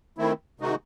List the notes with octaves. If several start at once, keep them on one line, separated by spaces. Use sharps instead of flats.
D#3 A3 C4 E4
C3 D#3 G#3 D#4 F#4